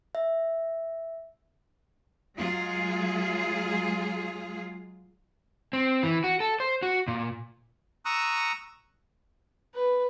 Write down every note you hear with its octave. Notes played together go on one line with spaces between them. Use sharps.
E5
F#3 G#3 F4 G#4
C4
E3
F#4
A4
C5
F#4
A#2
A#5 C#6 D#6 E6 F#6
B4